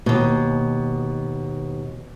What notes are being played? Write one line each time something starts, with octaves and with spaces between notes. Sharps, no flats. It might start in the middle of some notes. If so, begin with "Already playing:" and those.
D#2 B2